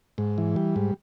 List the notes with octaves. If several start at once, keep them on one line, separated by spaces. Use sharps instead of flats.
G#2
E3
G3
G#2